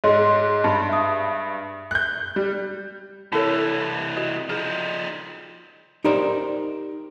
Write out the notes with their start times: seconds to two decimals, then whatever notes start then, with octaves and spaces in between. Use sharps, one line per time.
0.04 G#2 G#3 C#5 D#5 C6
0.64 G2 A5 B5
0.89 E5 D#6
1.91 F#6 G6
2.36 G3
3.32 C3 E3 E4 A4 A#4 C#5 A5
4.17 F#4 D#5
4.50 F3 D#4 G#4
6.04 D#4 G4 A#4 C5 D5